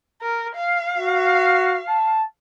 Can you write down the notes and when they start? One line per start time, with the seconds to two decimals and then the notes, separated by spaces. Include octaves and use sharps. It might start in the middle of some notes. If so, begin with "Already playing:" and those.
0.22 A#4
0.55 F5
0.97 F#4
1.88 A5